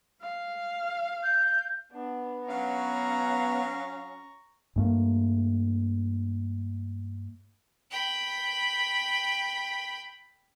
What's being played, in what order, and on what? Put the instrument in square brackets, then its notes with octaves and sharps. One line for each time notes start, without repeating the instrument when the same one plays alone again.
[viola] F5
[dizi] G6
[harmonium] B3 [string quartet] D4
[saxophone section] F#3 F5 [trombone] C#4 [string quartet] A#5 C#6
[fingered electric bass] G2 A3 A#3
[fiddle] G5 B5